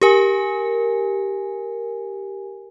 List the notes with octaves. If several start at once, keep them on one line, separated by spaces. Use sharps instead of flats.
G4 A#4 G#5